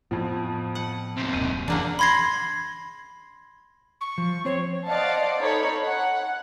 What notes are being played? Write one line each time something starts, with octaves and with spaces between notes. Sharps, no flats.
F2 A2 F3 B3
F#5
D#2 C3
D#1 F#2 B2 D#7
C#3 E3 A#3 D4 F#5
B5 C6 G#6 A#6 C7
C#6
F3
C4 C5 C#5
C5 D5 D#5 F5 F#5 A5
D#4 A4 C#5 B5
F#5